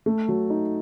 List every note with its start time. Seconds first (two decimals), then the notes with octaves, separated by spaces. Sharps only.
0.06 A3
0.29 F#3
0.50 D#4